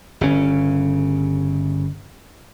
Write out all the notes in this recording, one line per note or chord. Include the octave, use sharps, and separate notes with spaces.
G1 C#3 C#4